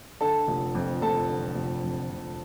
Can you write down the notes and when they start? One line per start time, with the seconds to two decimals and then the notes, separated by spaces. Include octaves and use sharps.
0.21 D3 A4 A5
0.48 F1
0.75 F2
1.02 F1 A4 A5
1.29 D3
1.56 F1
1.84 F2
2.10 F1